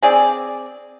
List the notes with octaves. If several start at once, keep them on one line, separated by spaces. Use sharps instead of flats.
C4 G#4 D5